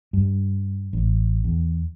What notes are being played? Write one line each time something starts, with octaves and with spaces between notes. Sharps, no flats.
G2
A1
E2